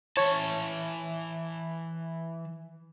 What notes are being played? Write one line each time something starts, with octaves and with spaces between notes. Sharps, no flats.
E3 C#5 A5